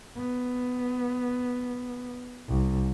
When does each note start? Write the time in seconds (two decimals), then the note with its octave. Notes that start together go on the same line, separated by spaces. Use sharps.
0.17 B3
2.48 C2